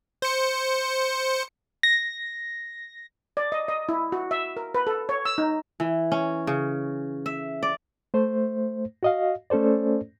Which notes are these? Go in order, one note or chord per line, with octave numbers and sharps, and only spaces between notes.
C5 C#7
A#6
D5
D#5
D#5
E4
F#4
E5
A#4
B4
A4
C#5
E6
D#4
E3
C#4
C#3
E5
D5
A3 C5
F#4 D#5 F5
A3 C#4 A4 C5 D5